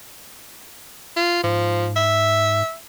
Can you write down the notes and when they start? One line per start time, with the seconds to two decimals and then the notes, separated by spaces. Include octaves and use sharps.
1.17 F4
1.44 G#2 F3
1.96 E5